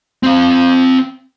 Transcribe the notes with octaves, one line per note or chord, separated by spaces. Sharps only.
C4 F5